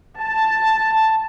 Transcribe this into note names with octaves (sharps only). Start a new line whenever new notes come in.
A5